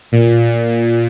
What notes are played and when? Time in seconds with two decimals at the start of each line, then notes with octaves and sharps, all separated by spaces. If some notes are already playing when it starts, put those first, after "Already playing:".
0.12 A#2